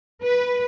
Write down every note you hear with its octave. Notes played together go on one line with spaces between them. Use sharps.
B4